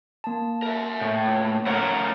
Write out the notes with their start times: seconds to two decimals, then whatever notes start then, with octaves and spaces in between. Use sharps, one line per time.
0.24 A#3 A5
0.62 A#4 E5
1.01 A2
1.25 C#2
1.67 A3 C#4 A#4 C#5 F#5